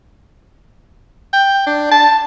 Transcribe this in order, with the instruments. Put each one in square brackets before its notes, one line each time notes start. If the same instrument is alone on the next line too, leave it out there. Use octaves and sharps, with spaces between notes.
[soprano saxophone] G5
D4
A5